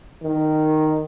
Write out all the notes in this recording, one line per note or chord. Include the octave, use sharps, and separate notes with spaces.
D#3